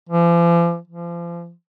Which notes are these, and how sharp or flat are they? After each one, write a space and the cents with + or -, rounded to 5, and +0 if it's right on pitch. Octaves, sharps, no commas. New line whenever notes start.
F3 -45
F3 -35